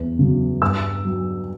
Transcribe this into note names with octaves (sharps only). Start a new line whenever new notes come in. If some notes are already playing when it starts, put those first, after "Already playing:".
Already playing: E2
C#3 F#3
G2 E6
F#3